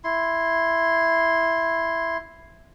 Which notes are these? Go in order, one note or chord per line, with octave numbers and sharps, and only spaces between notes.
E4 C6